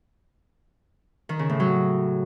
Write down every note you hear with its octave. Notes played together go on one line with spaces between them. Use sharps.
D#3
C#3
A2
F#3